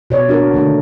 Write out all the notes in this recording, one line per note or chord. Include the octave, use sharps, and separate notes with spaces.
B2 C#5 D5
D4 F#4 A#4
D3 D#3 A3